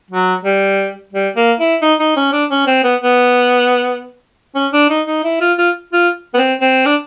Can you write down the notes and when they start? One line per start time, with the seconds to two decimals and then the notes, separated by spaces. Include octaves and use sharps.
0.11 F#3
0.45 G3
1.13 G3
1.36 A#3
1.60 E4
1.82 D#4
2.00 D#4
2.17 C#4
2.33 D4
2.51 C#4
2.67 C4
2.84 B3
3.01 B3
4.55 C#4
4.73 D4
4.89 D#4
5.07 D#4
5.24 E4
5.41 F4
5.58 F4
5.93 F4
6.34 B3
6.38 C4
6.61 C4
6.86 D4